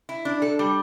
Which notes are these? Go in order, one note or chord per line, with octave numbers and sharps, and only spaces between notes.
E4
D4
A4
G3